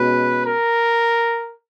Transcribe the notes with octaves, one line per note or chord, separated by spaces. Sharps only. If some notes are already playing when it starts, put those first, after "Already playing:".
Already playing: B2 G#3 C#4 B4
A#4